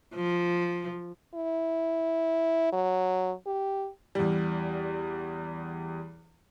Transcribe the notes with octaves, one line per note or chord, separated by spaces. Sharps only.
F3
E4
F#3
G4
E2 G3